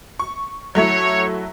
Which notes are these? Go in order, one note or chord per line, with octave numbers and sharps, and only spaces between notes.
C#6
F#3 A3 E4 C#5